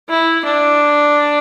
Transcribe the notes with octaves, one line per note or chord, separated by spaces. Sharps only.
E4
D4